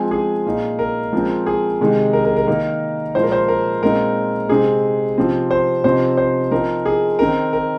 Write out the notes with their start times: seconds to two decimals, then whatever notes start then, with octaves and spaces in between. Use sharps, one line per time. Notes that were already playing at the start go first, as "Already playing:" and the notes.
Already playing: F3 G#3 C4 G#5
0.11 G#4
0.46 A#2 A#3 D#4
0.79 A#4
1.13 F3 G#3 C4
1.46 G#4
1.81 C3 D#3 G#3 D#4
2.13 A#4
2.25 A#4
2.36 A#4
2.47 D#3 A#3 D#4 A#4
3.15 A#2 F3 G#3 D#4 C5
3.23 A#4
3.32 C5
3.48 A#4
3.82 A#2 G#3 C4 D#4 A#4
4.49 C3 G#3 C4 D#4 G#4
5.17 C3 F3 C4 D#4
5.51 C5
5.84 C3 F3 C4 D#4 C5
6.17 C5
6.51 F3 C4 D#4 A#4
6.85 G#4
7.19 D#3 C4 D#4 A#4
7.53 A#4